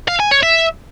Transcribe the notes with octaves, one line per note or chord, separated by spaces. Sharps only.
F5
G#5
C#5
E5